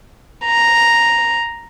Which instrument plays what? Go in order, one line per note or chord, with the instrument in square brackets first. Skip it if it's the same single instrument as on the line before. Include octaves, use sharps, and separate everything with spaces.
[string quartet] A#5